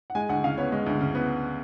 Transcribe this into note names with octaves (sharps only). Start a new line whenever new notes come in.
F#5
G#3 G#5
D2 F#5
C#3 F5
B3 C#5
G#3
D2
C#3
B3